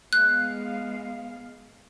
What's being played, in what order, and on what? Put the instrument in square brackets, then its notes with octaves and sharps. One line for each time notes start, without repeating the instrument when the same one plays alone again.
[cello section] G#3 B3 F5 [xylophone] F#6